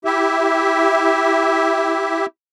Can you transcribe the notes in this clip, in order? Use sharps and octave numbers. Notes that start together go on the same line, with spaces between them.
E4 G4 E5